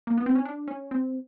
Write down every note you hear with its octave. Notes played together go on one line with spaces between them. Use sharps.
A#3
B3
C4
C#4
D4
C#4
C4